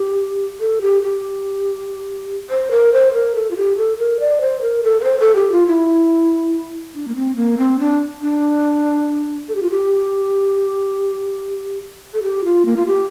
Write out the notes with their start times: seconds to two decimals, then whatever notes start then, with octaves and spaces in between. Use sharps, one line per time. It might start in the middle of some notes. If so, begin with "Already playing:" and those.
Already playing: G4
0.60 A4
0.81 G4
1.03 G4
2.50 C5
2.71 A#4
2.93 C5
3.14 A#4
3.35 A4
3.51 F4
3.57 G4
3.77 A4
3.98 A#4
4.20 D5
4.41 C5
4.62 A#4
4.83 A4
5.00 A#4
5.04 C5
5.20 A4
5.35 G4
5.52 F4
5.67 E4
6.95 D4
7.08 A#3
7.15 C4
7.36 A#3
7.58 C4
7.79 D4
8.21 D4
9.48 A4
9.55 G4
9.63 F4
9.70 G4
12.13 A4
12.23 G4
12.44 F4
12.66 A#3
12.76 F4
12.86 G4